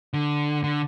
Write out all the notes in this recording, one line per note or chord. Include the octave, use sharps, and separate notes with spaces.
D3
D3